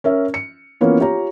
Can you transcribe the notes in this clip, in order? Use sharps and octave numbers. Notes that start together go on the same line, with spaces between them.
C#4 A#4 E5
C#7
E3 A#3 B3 C#4 F4
F4 G4 C#5 A#5